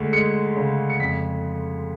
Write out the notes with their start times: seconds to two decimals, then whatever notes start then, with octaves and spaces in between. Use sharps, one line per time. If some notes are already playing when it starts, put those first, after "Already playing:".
Already playing: D2 G#3
0.13 G#3 C#7
0.56 C#3
0.90 C#7
1.00 F2 B6